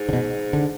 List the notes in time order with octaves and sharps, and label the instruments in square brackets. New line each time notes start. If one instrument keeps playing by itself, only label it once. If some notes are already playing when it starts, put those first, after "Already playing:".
Already playing: [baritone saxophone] G#2
[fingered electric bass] D3
B2
D3